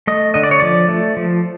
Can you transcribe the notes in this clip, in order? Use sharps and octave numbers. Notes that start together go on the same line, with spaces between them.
A3 D#5
D3 D#5
D5
C#5
F3 D5
A3
F3